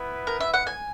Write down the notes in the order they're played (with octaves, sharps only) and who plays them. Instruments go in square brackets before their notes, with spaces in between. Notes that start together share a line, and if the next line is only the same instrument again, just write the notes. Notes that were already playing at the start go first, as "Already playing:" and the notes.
Already playing: [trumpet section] B3 E4 B4
[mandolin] A#4
E5
F#5
G#5